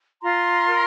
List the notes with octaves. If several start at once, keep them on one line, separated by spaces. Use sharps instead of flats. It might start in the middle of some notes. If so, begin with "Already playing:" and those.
F4 A#5 C6
A#4